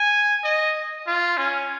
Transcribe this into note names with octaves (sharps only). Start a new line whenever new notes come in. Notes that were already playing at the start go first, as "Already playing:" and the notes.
Already playing: G#5
D#5
F4
C#4